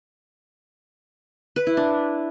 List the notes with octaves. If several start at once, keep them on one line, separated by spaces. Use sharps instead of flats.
B4
E4
D4